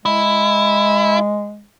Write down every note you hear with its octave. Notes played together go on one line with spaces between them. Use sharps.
G#3 E4